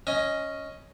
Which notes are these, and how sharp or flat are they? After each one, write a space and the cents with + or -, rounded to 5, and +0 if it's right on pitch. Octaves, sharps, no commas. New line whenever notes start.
C#4 +0 D#5 +10